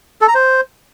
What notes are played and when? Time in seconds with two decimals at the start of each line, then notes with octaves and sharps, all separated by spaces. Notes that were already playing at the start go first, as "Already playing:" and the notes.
0.21 A4
0.28 A#5
0.35 C5